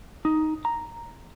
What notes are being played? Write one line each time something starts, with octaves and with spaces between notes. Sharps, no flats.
D#4
A#5